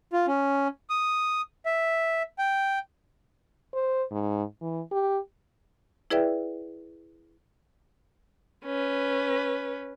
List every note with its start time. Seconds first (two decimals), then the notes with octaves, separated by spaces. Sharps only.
0.13 F4
0.27 C#4
0.90 D#6
1.65 E5
2.38 G5
3.74 C5
4.11 G#2
4.61 E3
4.92 G4
6.10 E4 G#4 B4 D5 E5 G5
8.65 C#4 B4